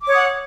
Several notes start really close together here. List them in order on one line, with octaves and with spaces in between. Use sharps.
D6 C#5 D#6 F#5